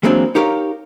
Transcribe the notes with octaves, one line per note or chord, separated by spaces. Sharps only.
E3 F#3 G#3 A#3 C4 D4
D#4 G4 A#4 C#5 F5